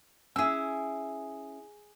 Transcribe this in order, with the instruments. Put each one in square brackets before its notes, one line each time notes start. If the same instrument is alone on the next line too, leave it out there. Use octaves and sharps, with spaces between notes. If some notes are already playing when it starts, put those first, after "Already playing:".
[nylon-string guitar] C#4 E4 [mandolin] G#4 E6